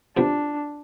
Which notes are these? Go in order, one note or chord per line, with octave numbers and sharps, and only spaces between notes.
C3 F3 B3 D4